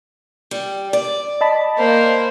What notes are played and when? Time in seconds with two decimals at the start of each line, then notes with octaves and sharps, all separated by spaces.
0.51 G3
0.93 D5
1.41 D#5 A5 B5
1.77 A#3 C5